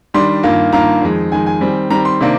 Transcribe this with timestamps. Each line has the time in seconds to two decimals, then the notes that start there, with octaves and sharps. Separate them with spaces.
0.14 D#3 G3 D4 C6
0.43 G2 D#3 A#3 F4
0.72 G2 D#3 A#3 F4 A#5
1.02 F2 D#3 G#3
1.32 F2 D#3 G#3 G#5
1.46 G#5
1.61 D#3 G3 C4
1.90 D#3 G3 C4 A#5
2.05 C6
2.20 C3 D#3 A#3 D4